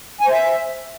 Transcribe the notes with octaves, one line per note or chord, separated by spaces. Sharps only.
G#5
C5
E5